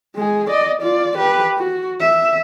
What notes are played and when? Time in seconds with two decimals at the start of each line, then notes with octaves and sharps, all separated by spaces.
0.16 G#3 G#4
0.50 D5 D#5
0.82 F4 D5
1.18 G4 B4
1.58 F#4
2.00 E5